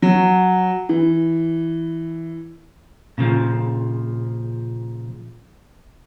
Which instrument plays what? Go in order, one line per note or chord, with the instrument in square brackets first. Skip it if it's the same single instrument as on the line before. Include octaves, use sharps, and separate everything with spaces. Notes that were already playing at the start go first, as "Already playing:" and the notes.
[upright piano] F#3
E3
[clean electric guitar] A#2 C#3 E3 F3